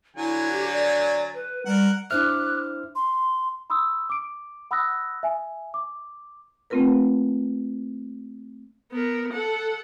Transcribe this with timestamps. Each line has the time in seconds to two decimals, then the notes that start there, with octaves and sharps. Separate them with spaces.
0.17 D3 F#3 E4 G#5
0.52 G4
0.72 D5
1.34 B4
1.66 G3 A#4 F#5
2.11 D4 E4 C5 E5 D6 F6 F#6
2.95 C6
3.70 B5 C6 D#6 E6
4.10 D6 D7
4.71 F#5 B5 D#6 E6 F#6 A#6
5.23 E5 G#5
5.74 D6
6.70 A3 A#3 C4 F4 A#4 B4
8.92 B3 A#4
9.33 A4 F#5